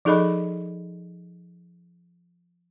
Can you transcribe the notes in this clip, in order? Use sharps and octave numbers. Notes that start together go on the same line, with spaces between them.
F3 D#4 G#4 A4 D#5 B5